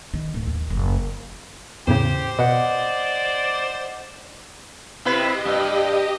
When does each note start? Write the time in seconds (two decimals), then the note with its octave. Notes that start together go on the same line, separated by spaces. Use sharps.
0.14 D#3
0.34 D1
0.47 D#2
0.70 F#1
1.87 E2 A2 C#3 G4 C5
2.39 B2 D5 D#5 F#5
5.05 C3 E4 G4 B4 D#5
5.45 G2